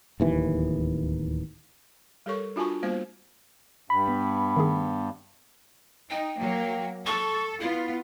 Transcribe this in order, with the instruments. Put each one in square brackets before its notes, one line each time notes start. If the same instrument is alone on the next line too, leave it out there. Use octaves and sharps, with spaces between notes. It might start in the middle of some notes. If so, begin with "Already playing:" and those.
[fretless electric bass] D1 D#2 E3
[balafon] G3 G4 A4 A#4 C#5 C#6
D4 F4 F#4 G#5 A5 C#6
G3 A#3 B3 F4 C5 F5
[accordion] G2 [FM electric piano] B5
[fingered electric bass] B3
[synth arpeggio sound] D#3 A3 G#4
[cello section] D#4 [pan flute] G5
[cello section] F#3 A#3
[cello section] A4 [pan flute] C#6
[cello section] B3 F4 [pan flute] E4